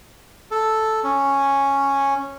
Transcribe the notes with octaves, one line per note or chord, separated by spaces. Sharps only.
A4
C#4